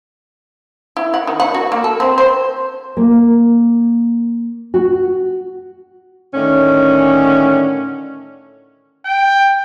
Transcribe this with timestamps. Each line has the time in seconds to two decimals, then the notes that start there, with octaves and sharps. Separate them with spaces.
0.97 E4
1.14 F#5
1.27 D#3
1.40 F#5
1.54 F#4
1.72 A#3
1.84 A4
2.00 C4
2.18 C5
2.97 A#3
4.74 F#4
6.34 A2 D3 D#3 C#4
9.05 G5